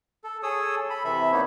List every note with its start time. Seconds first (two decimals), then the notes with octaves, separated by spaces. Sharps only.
0.24 A4
0.43 G#4 A4 C#5 D#6 E6
0.90 A4 B5
1.05 C3 E3 E5 B5
1.32 D3 A#3 B3 D#4 C#5